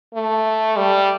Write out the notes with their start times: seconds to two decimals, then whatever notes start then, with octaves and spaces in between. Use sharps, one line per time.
0.14 A3
0.77 G3